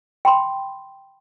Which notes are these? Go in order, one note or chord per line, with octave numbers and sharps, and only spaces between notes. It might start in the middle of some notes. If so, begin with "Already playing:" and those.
G5 B5 C6